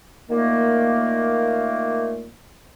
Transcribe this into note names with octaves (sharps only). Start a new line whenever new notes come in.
A#2 D#3 A3 A#3